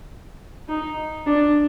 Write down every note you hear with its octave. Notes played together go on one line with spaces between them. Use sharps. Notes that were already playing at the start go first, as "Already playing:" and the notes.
D#4
D4